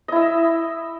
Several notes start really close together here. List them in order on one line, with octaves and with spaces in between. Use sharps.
D#5 E4 E5